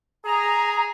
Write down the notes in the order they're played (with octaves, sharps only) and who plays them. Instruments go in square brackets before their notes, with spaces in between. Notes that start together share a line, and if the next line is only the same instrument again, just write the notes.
[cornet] G#4 [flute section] A#5